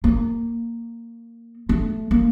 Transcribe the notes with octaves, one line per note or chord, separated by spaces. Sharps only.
A#3
A3
A#3